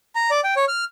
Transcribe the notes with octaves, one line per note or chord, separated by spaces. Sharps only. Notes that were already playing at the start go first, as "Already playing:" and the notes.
A#5
D5
G5
C#5
F6